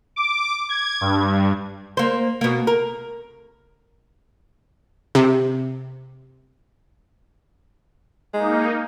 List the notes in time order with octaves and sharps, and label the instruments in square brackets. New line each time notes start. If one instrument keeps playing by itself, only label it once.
[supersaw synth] D6
G#6
G2
[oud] A#3 C5
B2 A#3
A#4
[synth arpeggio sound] C3
[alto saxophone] G#3 [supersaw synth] A#3 D#4